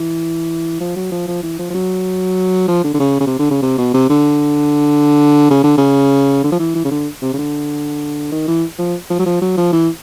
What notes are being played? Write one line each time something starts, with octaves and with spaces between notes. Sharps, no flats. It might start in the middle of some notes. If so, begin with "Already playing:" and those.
Already playing: E3
F3
F#3
F3
F3
E3
F3
F3
F#3
F3
D3
D3
C#3
C#3
C3
D3
C#3
C3
B2
C3
D3
C#3
D3
C#3
D3
F3
E3
E3
C#3
D3
C3
C#3
D3
D#3
E3
F3
F3
F#3
F3
F#3
F3
E3